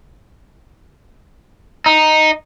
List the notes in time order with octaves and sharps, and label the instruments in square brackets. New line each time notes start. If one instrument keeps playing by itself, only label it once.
[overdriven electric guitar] D#4